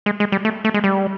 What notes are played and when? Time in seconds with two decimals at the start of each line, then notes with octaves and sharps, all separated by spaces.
0.06 G#3
0.20 G#3
0.32 G3
0.45 A3
0.65 A3
0.74 G#3
0.84 G3